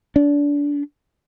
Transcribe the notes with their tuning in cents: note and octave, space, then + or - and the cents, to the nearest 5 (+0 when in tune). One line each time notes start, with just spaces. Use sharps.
D4 -25